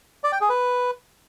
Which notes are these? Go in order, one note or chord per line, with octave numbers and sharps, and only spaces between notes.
D5
G5
G#4
B4